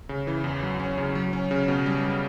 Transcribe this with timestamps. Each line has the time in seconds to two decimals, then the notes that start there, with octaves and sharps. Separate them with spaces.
0.09 C#3
0.27 E3
0.44 E2
0.63 F#3
0.80 C#4
0.98 C#3
1.15 F#3
1.33 C#4
1.51 C#3
1.68 B2
1.86 G3